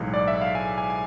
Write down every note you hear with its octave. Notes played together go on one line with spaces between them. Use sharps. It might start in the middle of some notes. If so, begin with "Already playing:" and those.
Already playing: B1 A2 E3 G#3
D5
E5
F5
G#5
G#5
G#5